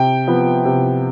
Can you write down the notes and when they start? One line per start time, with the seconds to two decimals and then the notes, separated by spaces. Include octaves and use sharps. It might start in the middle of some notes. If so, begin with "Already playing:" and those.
Already playing: C3 G5
0.27 F3 B3
0.65 C3